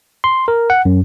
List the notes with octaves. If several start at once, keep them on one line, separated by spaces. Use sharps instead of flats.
C6
A#4
F#5
F#2